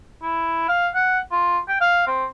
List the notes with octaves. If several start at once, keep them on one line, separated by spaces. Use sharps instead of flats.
E4
F5
F#5
F4
G5
F5
C4